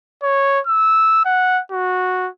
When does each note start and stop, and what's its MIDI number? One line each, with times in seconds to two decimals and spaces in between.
0.23 0.60 73
0.67 1.21 88
1.25 1.61 78
1.72 2.29 66